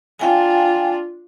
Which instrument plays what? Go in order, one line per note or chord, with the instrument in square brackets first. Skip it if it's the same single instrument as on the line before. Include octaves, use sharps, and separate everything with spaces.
[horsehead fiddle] D4 F4 [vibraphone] F5 G5 G#5